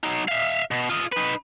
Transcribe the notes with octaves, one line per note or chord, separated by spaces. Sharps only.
F#3 D#4
E5 F5
B2
F4 D#5
D#4 B4